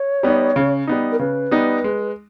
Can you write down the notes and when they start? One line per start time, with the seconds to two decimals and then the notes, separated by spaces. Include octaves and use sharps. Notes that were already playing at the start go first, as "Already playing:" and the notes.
Already playing: C#5
0.23 G3 B3 D#4
0.56 C#3
0.87 G3 B3 D#4
1.12 A#4
1.19 C#3 B4
1.51 G3 B3 D#4
1.84 G#3